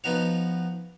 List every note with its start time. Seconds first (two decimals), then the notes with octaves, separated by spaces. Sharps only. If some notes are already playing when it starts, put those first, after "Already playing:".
0.04 F3 B3 D#4 F#4 C#5